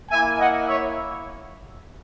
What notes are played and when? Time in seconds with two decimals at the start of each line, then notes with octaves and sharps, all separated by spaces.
0.10 A#3 E5 G#5
0.15 E4
0.39 D#5 F#5
0.68 C#5 E5